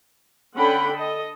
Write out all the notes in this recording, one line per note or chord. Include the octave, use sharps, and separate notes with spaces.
D3 C#4 F#5 G5 B5
A4 D#5